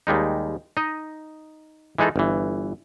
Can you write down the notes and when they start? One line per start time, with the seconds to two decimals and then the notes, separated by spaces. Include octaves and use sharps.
0.07 D#2 G3 G#3 D#4
0.77 D#4 D#5
1.98 E3 G#3 D#4 G#4 A4
2.16 G1 E3